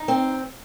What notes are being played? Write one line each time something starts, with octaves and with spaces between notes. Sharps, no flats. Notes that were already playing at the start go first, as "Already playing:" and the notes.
Already playing: D#4
C4